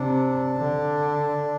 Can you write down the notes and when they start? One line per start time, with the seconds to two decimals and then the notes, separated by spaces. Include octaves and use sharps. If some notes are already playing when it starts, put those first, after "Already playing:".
Already playing: C3 D4
0.56 D3